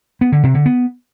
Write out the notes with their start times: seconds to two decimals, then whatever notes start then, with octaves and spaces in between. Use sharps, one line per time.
0.21 B3
0.32 D3
0.43 C3
0.55 D3
0.66 B3